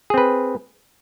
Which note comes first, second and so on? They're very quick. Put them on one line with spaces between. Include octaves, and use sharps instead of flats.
G#4 C4 B4